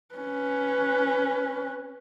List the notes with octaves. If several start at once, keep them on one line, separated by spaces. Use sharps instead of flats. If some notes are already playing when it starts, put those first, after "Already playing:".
C#4 B4